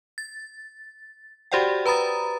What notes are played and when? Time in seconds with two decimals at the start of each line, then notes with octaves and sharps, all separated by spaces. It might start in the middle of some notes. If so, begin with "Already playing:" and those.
0.18 A6
1.52 F#4 G4 C5 D5 F#5 G5
1.86 B4 A#5 B5 D#6 A6